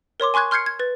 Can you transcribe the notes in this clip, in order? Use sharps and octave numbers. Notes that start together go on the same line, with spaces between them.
A#4 C#5 C6 D6
G#5 C6 C#6 F#6 G#6
C6 F6 G6 G#6 C7 C#7
G#6
B4 A6